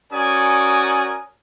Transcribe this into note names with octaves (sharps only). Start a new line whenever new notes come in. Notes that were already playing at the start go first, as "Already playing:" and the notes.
C#4 F#4 A#4 D5 G#5 D#6